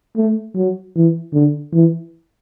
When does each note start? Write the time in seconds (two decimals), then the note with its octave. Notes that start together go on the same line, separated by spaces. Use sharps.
0.17 A3
0.56 F#3
0.95 E3
1.33 D3
1.73 E3